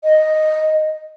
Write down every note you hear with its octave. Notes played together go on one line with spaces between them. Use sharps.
D#5